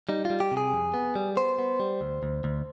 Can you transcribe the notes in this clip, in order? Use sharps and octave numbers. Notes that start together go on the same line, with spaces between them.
G3 D#4
F4
G3
G4
C3
G#4
F2
B3
G3
B3 C5
B3
G3
D2
D2
D2